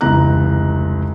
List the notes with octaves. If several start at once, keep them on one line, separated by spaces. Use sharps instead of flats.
F1 C#2 E3 A#5 F#6